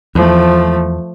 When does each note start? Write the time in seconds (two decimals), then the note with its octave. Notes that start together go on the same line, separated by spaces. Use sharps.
0.15 E2 F3 A3